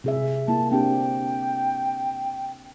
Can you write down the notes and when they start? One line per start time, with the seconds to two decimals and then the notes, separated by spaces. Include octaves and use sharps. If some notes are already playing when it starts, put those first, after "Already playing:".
0.04 C3 G#4 E5
0.48 A#3 E4 A5
0.71 C4 D4 G4 G5